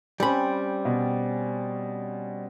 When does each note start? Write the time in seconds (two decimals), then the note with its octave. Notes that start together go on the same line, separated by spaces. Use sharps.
0.20 G3 C4 C#4 G5 B5
0.85 B2